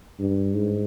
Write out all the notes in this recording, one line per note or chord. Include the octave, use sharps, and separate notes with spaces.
G2
G#2